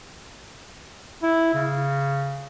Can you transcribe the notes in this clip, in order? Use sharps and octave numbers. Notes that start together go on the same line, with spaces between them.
E4
C#3